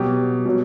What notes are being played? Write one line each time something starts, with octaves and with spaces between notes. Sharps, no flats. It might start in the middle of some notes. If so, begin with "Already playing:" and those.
Already playing: B2 F#3 G4
B2 F#3